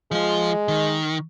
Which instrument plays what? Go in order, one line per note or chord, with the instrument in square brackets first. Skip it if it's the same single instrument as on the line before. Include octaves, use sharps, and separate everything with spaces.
[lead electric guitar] F3 F4 [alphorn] G#3
[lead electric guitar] D#3